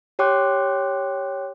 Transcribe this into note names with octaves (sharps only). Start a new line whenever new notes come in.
G4 C#5 G5 C6 D6 F#6